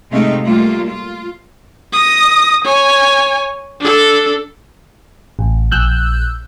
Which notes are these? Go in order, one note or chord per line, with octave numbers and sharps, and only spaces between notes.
C3 G#3 A3 C4 D#4 F5
G3 A3 A#3 F4
F4
D#6 A#6
C#5 G#5
D4 A4
A1
A#1 E6 F#6 G6